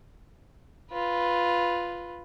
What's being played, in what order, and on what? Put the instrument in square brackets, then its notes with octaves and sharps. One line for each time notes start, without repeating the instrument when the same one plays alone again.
[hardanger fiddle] F4 B4